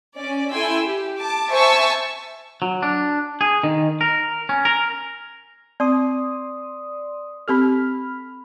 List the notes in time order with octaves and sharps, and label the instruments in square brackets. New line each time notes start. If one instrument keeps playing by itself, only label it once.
[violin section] C#4 D5
E4 A4 G5 G#5 C6 E6
G4
A5 D6
C5 E5 G#5 A5 C#6 E6
[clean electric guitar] F#3
D4
G#4
D#3
A#4
C#4
A#4
[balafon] C4 [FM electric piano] D5 C6 D#6
[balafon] C4 G4 A4 [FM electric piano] B5 F6